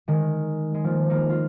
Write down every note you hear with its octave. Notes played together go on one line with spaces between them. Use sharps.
D#3 G#3
G#3
F3 A#3
A#3 D#4
F4